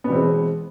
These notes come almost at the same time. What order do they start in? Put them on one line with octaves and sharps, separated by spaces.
B3 B2 E3 C4 G#3